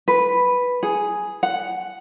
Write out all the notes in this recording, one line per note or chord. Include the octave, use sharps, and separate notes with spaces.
B4
G#4
F#5